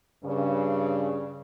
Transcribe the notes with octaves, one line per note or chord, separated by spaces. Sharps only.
G2 C#3